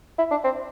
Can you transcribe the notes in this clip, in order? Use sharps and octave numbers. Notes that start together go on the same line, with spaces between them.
E4
D4
C4